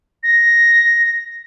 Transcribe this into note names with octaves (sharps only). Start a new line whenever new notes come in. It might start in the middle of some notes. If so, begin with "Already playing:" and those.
A#6